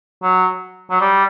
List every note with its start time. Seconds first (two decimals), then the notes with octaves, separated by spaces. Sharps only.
0.23 F#3
0.91 F#3
1.01 G3